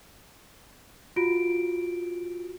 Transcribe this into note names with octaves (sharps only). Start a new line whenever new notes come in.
F4 F#4 D7